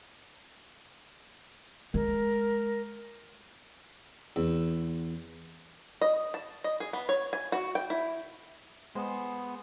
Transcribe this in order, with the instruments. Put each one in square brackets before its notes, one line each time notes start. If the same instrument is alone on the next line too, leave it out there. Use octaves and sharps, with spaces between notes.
[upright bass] G#3 [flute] A#4
[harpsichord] E2
[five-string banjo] D#5
A5
D#5
G#4
B3
C#5
G#5
F#4
G5
E4
[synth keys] G#3 [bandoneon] B3 [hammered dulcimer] G#4 C5